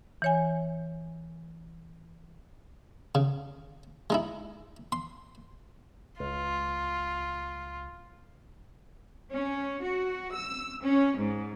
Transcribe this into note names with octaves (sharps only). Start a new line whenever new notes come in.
E3 C#5 G#5
C#3
G#3 D#4 E4
C6
C#2 F4
C#4
F#4
E6
C#4
G#2